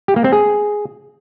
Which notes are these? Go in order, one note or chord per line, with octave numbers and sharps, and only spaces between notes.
G4
A#3
C4
G#4